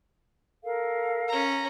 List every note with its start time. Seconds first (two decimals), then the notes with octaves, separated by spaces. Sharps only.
0.63 A4 A#4 F5
1.28 C#4 A#5